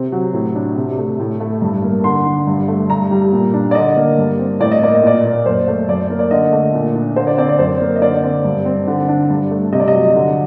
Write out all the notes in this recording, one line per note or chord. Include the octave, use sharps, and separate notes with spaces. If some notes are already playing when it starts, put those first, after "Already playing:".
Already playing: C3 C4
F#3
A2
D4
C3
A3
A2
A3
G2
A#3
D3 C6
D4
G2
A3
G2 A#5
G3
A#2
D4
D5
D3 D#5
A#3
G2
C4
A2 D5
D#5
A#3 D5
D#5
A#2 D5
A#3
F#2 C5
A3
F#2 D5
A#3
D5
D3 D#5
A3
A#2
D4
D3 C5
D5
C4 D5
D5
F#2 C5
A#3
D#5
D3 D5
C4
G2
C4
D3
D4
G2
A3
C3 D#5
D5
D#5
F#3
D3